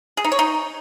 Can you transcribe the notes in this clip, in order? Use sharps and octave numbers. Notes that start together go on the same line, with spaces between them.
G#4
D#4
C#5
D#4